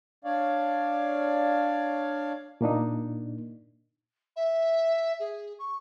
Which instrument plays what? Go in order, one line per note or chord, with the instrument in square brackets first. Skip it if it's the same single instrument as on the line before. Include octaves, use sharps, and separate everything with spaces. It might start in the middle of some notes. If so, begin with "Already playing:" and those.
[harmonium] D4 C#5 D5 F5
[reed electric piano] A#2 A#3 D4 D#4
[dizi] E5
G#4
C#6